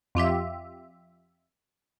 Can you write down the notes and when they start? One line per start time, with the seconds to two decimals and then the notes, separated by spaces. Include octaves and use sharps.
0.15 F2 F4 G4 E5